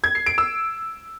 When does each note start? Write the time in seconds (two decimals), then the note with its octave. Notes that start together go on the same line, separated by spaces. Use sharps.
0.04 G#6
0.15 C7
0.26 D7
0.38 E6